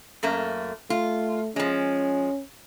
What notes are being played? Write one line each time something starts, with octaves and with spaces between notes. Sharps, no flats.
F#2 A3 A#3
A3 F4
F3 G#3 C#4